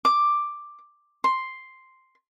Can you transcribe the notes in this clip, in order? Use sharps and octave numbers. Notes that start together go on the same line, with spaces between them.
D6
C6